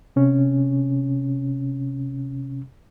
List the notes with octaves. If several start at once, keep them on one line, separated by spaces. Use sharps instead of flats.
C3 C#4